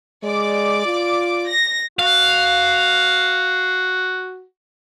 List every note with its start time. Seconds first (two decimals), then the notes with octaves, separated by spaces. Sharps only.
0.23 G#3 D5 D6
0.86 F4
1.48 A#6
1.99 F#4 F5